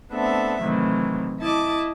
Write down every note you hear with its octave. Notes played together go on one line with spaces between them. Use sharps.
A3 B3 C4 D4 A4 E5
A2 C3 D#3 E3 F#3
E4 D#5 A5 D6